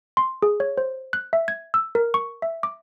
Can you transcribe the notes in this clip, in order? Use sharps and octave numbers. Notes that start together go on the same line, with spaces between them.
C6
G#4
C#5
C5
F#6
E5
G#6
E6
A#4
C#6
E5
D6